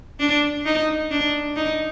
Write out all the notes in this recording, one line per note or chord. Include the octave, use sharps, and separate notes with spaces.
D4
D#4
D4
D#4